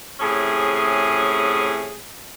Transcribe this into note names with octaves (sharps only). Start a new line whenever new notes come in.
A2 C3 C#4 G#4